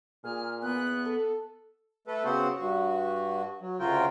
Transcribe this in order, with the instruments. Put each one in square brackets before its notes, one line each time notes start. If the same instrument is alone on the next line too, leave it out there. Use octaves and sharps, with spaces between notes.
[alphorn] A#2 [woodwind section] G#4 [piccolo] F6
[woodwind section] E2 [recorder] B3 [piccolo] F#6
[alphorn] A4
[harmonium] A3 A4 B4
C#3 B3 C4 F#4 C5 F#5
G2 F#4
F#3
D2 C#3 F4 F#4 A#4 G5